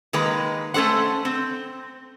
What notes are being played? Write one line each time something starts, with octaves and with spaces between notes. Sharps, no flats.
D#3 G#3 A#3 B4 A#5
A3 C#4 A4 C5 F#5
C4